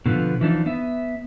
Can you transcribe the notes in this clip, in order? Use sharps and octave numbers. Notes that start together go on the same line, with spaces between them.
B2 D3 F3 B3
E3 F3 D4 D#4
B3 E5